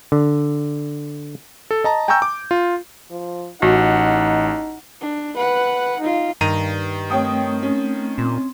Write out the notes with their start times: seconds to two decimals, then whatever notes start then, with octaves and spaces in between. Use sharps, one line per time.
0.12 D3
1.71 A4
1.84 D#5 A5 A#5
2.08 G5 G#5 A#5 C#6 E6 G6
2.22 D6
2.51 F4
3.11 F3
3.62 A1 D#4 F#4 F#5
5.01 D4
5.37 B4 F#5
6.01 D#4 F4
6.41 G2 D#3 A#5 D#7
7.10 A3 C4 C#5 G5 D#6
7.63 C#4
8.18 A#2 C4